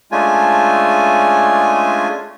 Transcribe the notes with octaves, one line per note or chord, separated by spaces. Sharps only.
G#3 A3 C#4 D4 F4 G#5